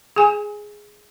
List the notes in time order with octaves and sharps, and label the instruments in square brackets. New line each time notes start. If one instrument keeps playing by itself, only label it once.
[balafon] G#4 G#5